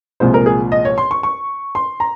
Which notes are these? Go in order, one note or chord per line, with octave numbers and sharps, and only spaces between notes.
C2 A#2 F3 G#3 C5
A#4
G#4
D#5
C#5
C6
C#6
C#6
C6
A#5